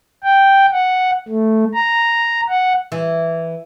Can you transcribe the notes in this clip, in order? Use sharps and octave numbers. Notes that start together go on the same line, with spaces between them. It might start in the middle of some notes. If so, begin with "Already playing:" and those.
G5
F#5
A3
A#5
F#5
E3